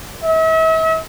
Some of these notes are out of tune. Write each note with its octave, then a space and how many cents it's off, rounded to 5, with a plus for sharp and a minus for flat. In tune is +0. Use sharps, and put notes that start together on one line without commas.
E5 -40